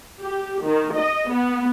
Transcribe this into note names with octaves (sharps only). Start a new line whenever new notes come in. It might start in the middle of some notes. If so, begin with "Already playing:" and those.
G4
D#3
D#5
B3